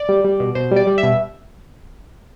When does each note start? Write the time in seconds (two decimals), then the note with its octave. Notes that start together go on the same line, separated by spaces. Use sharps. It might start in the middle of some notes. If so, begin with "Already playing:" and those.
Already playing: D5
0.09 G3
0.25 G3
0.40 B2
0.55 B2 C5
0.71 G3 D5
0.87 G3
0.98 E5
1.03 B2